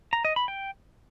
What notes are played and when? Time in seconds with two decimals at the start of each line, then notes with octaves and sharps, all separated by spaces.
0.13 A#5
0.25 D#5
0.36 B5
0.48 G5